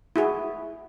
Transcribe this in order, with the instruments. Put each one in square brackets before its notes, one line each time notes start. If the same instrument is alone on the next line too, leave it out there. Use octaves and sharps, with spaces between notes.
[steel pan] E4 F#4 G#4